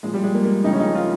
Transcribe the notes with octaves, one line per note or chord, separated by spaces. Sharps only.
A#2 F3 G#3
G3
G#3
A#3
A#3
F2 C#3 F3 D#4
C#4
D#4
F4